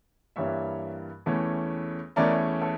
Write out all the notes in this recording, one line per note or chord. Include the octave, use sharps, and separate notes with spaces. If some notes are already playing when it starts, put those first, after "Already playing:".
G2 E3 G3 A#3 C#5 E5
E2 E3 A3 C#4
E2 E3 A3 C#4 A#4 D5
A4 C#5